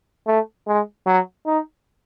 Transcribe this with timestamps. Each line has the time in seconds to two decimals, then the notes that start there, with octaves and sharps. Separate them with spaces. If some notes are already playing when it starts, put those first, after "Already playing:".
0.27 A3
0.67 G#3
1.06 F#3
1.47 D#4